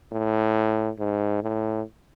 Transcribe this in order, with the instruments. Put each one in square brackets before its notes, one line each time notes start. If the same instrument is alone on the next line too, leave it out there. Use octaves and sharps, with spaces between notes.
[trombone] A2
G#2
A2